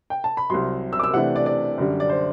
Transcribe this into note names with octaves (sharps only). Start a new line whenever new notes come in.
G5
A5
B5
C2 C3 F#3 C6
E6
D6
E6
C3 E3 A3 D4 F#5
D5
D5
F#2 D3 G3
D5
C5